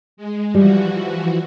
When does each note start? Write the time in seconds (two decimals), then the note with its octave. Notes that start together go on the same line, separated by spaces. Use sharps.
0.17 G#3
0.54 E3 F3 G3 F#4